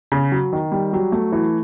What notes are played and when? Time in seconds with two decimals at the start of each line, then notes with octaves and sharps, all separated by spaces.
0.12 C#3
0.32 F#3
0.53 D#3
0.72 G3
0.93 F#3
1.12 A3
1.32 E3